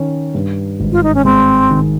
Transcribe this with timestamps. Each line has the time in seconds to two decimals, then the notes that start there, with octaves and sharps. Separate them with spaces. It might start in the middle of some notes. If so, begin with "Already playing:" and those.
Already playing: D#3 C#4
0.35 G2
0.80 G#1
0.92 F4
1.03 D#4
1.15 C#4
1.25 G#3 C4
1.71 D#3